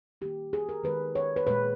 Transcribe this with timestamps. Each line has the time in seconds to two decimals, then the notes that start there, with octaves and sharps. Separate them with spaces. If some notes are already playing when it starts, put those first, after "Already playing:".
0.21 D#3 A#3 G4
0.53 G#4
0.69 A#4
0.84 D#3 G#3 B4
1.15 C#5
1.36 B4
1.47 A#2 G#3 B4